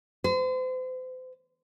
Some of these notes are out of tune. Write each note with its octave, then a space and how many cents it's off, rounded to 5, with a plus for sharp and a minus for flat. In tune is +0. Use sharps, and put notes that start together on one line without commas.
C5 -40